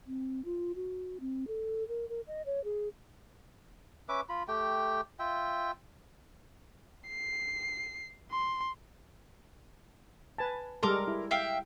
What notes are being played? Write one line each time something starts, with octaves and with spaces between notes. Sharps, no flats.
C4
F4
F#4
C4
A4
A#4
A#4
D#5
C#5
G#4
C#4 B4 E5 D6
F4 B5
A3 G4 G5
F4 E5 G5
C7
C6
B4 G#5 A5
G3 G#3 A4 A#4 C6 D6
E4
E5 F5 G5